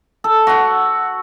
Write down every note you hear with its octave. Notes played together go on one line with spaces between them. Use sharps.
A4
F#4 F#5